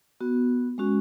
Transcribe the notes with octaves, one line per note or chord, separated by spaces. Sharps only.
B3 F#4
G#3 C#4 F#4